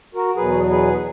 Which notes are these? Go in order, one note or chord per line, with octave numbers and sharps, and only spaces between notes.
F#4 A#4
E2 B2 F#3 G#4 B4
G#4 B4